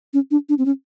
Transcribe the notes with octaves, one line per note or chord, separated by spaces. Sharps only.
C#4
D4
D4
C4
C#4